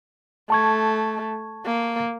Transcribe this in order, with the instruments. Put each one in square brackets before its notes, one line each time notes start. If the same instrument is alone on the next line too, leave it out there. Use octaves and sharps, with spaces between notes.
[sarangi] A3 [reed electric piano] A5 C#6 G#6
[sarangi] A#3